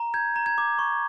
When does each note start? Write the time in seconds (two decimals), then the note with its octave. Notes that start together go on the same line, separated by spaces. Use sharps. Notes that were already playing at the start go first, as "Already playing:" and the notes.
Already playing: A#5
0.14 G6 G#6
0.36 A#5
0.46 G#6
0.58 D6
0.79 C#6